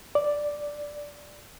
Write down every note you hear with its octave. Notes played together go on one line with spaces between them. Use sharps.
D5